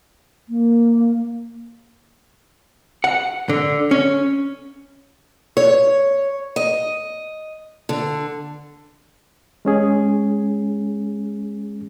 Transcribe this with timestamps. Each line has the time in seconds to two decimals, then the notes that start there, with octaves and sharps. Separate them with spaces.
0.49 A#3
3.04 F#5
3.49 D3
3.91 C#4
5.57 C#5
6.56 D#5
7.89 D3
9.65 G#3 C#4 G#4